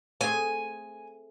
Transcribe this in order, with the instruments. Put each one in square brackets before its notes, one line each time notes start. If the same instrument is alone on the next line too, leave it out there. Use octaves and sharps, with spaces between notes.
[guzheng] A3 C4 G#4 [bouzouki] G#5